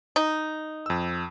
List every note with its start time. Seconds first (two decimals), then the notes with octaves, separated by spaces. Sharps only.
0.16 D#4
0.86 F2 E6